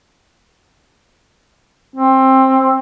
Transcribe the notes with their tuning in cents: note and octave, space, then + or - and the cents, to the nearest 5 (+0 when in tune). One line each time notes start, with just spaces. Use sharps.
C4 +20